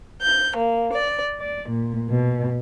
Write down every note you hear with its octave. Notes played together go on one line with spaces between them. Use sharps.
G6
A#3
D5
D5
A#2
B2